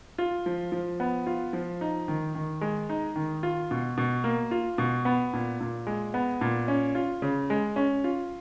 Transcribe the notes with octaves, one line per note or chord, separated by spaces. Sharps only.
F4
F3
F3
B3
F4
F3
D#4
D#3
D#3
G#3
D#4
D#3
F4
B2
B2
A#3
F4
B2
B3
A#2
A#2
G#3
B3
A#2
C#4
F4
C#3
G#3
C#4
F4